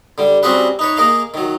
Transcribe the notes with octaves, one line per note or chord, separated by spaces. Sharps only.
D3 G3
G3 C4 C#4 F#4 G#4 B4
D#4 B4 C#5
A#3 G#4 A#4 D#5 F5
D#3 F#3